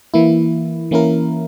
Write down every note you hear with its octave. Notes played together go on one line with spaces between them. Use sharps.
E3 A#3 E4
E3 A#3 C#4 E4 A#4